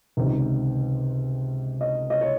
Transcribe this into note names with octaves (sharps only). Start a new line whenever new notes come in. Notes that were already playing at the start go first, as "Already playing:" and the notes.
C#2 C3 D#3
D#5
D#5
C#5